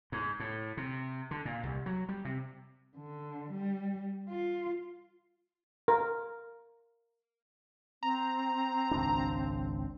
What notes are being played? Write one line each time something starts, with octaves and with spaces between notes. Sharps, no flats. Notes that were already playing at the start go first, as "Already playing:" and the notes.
G#2
A2
C3
D3
A#2
C2
F#3
G3
C3
D3
G3
F4
A#4
C4 A#5
G#1 C#2 D4